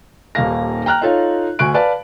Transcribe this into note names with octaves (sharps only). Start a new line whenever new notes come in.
D#1 D#2 D#3 A#3 F5 A#6
G5 A#5 F6 F#6
D#4 F4 A4 C#5 F5
D2 G#5 C#6 F#6 D7
B4 D5 F5 A5